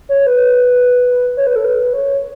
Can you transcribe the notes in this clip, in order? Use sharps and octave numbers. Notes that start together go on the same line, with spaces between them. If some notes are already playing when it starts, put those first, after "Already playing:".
C#5
B4
C#5
B4
A4
B4
C#5